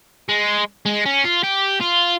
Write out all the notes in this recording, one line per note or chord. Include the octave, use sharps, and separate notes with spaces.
G#3
G#3
C#4
F4
G4
F4